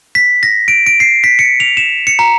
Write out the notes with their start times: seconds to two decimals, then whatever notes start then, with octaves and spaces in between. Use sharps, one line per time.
0.15 B6
0.43 A#6
0.68 D7
0.87 D7
1.00 C7
1.24 B6
1.39 C#7
1.60 F7
1.77 E7
2.07 C#7
2.19 A#5